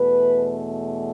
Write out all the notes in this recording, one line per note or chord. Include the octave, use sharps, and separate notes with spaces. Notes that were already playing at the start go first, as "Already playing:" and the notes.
Already playing: E2 B2 A3 B4